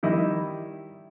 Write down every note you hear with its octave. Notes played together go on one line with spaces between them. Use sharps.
D#3 G3 E4 D#5